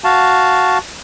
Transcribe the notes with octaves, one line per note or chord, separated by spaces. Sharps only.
F#4 F5 A5